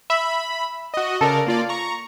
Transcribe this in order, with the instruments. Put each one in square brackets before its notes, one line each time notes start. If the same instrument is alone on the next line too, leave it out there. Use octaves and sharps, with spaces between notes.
[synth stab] E5 [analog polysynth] B5
[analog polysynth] F#4 D#5
[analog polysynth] C#3 A#4 D5 [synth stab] A4
[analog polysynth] A#3 F4 D5
A#5 C#6